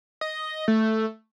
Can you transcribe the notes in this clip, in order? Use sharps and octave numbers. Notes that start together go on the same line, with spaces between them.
D#5
A3